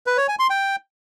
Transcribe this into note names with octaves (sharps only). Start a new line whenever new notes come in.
B4
C#5
G#5
C6
G5